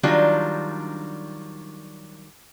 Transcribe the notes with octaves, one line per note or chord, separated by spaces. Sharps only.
D#3 F#3 G3 D4 F4